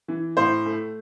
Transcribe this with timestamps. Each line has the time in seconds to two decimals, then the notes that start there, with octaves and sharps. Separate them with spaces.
0.08 E3
0.37 A2 C5
0.66 A3